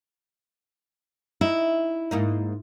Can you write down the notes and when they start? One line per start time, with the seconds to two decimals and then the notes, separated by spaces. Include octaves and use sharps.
1.41 D#4 E4
2.11 G#2 A#3 D#4